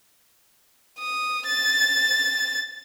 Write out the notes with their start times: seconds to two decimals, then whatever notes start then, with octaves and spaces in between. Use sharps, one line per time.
0.99 D#6
1.46 A6